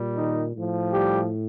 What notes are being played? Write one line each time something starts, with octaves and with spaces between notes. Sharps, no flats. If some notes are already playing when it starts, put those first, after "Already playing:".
Already playing: A#2 G3
D#3 D#4
A2 F3
G3 G4